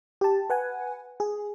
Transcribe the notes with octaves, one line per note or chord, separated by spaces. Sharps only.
G4 A5
B4 F#5 G#5
G#4